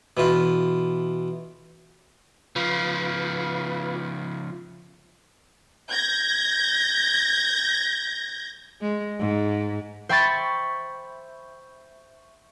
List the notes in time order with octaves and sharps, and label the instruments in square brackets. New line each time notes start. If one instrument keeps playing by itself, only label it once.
[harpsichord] B2 E3 F4
[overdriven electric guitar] C#3 F3 [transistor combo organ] F4 B4
[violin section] G6 G#6 A#6
[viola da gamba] G#3
G#2
[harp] C5 E5 G5 B5 C#6 A6